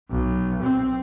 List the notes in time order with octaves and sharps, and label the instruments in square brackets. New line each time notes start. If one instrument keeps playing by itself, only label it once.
[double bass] B1
C4